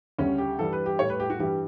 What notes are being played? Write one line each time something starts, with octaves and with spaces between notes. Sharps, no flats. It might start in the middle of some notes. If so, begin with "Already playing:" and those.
D2 C#3 G3 C#4
G4
G2 E3 G3 A4
B4
G4
A2 G3 C#5
B4
G4
F#4
G2 E3 G3 G4